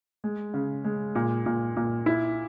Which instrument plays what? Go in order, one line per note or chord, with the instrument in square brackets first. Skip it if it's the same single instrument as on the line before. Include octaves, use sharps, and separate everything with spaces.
[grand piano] G#3
C#3
G#3
A#2
A#2
A#2
E4